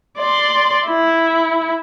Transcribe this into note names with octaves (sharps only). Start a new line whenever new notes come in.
D5 C6
E4